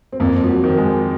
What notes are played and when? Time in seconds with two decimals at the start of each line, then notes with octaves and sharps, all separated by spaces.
0.12 C4
0.20 F2 A#3
0.44 F3
0.48 F#3
0.64 D#3
0.78 G#3